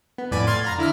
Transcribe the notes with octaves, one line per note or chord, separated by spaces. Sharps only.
B3
F2 A2 D5 G#5 B5 D#7
C6 F6 G#6 A6
F5 A#5 A#6
D3 E4 E5 F6